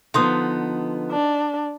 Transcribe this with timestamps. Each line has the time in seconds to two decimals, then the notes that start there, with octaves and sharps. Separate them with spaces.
0.14 D3 F3 B3 D#4 C6 D#6
1.11 D4